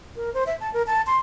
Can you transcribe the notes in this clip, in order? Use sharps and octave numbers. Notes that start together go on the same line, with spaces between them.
A#4
C5
E5
A5
A#4
A5
C6